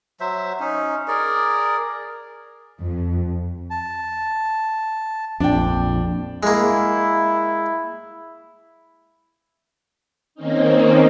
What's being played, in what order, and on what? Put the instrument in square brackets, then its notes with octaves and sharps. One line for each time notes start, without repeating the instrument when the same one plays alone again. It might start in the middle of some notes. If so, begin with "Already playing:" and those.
[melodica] F#3 C5 E5
C#4 D#4
G#4 A#4 D5
[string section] F2
[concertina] A5
[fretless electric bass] A#1 F2 [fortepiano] D4 G5
[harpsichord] G#3 A#3 [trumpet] E4
[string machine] D#3 A#3 C4 C#4 D#4